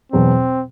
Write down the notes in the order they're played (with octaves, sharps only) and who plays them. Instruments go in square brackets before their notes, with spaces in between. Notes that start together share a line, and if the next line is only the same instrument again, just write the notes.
[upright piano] E2 B2 F#3 [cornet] C4